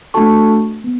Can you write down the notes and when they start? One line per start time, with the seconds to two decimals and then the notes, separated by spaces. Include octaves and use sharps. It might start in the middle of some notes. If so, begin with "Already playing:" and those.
0.14 A3 D4 F#4 A4 A5 C#6
0.84 B3